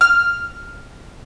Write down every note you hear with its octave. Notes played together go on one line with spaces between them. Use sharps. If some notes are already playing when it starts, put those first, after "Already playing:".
F6